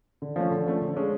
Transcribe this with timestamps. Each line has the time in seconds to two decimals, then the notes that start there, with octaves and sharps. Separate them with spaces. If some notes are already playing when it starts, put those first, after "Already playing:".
0.22 D3
0.36 F3 A3 C#4
0.51 D3
0.67 F3 A3 C#4
0.82 D3
0.96 G#3 C#4